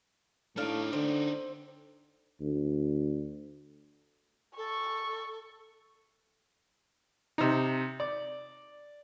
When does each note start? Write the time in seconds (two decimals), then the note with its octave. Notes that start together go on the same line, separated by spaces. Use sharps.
0.57 A2 A3 D4 D#4 D5 F5
0.93 D3 C4
2.41 D2
4.57 A4 C#6
7.38 C3 D#4
8.00 D5